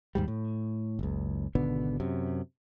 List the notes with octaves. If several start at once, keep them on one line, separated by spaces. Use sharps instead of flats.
D#2 G#2 G3
A2
F#1 C#2
G#1 B2 D3 B3
F#2 C3